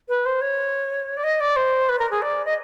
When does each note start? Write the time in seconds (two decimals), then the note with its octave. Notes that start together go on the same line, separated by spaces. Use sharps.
0.09 B4
0.25 C5
0.41 C#5
1.17 D5
1.23 D#5
1.40 D5
1.56 C5
1.89 B4
1.99 A#4
2.11 G#4
2.22 D5
2.45 D#5